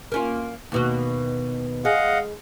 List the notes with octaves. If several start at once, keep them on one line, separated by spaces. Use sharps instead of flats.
A#3 C#4 F4
D#2 B2 F#4
G#3 D#5 F5 F#5